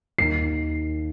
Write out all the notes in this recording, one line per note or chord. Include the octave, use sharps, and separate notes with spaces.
D#2 D#3 C7